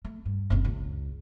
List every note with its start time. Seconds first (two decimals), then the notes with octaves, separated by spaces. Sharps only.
0.05 A3
0.25 G2
0.50 F#1 C2
0.65 C#2